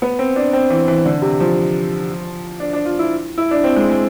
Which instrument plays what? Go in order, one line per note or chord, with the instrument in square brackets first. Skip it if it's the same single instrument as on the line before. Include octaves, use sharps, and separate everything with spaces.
[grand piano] B3
C4
D4
C4
E3
E3
D3
C3
F3
D4
D4
F4
E4
E4
D4
C4
G#3
G#3